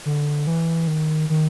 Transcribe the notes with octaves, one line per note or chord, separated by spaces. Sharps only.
D3
E3
D#3
D#3